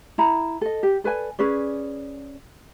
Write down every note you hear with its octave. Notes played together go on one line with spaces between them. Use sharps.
E4 A#5 B5
A4 D#5
G4
A4 B4 D5 G#5
C#4 G#4 B4 D5